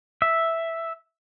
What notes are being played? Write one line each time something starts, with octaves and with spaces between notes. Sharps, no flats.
E5